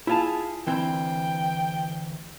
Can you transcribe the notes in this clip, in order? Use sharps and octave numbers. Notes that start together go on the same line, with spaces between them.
E4 F4 G#4 A5
D2 E3 C4 G5